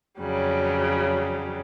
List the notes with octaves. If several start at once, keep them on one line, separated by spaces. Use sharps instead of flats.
F2 C#3 F#3 G3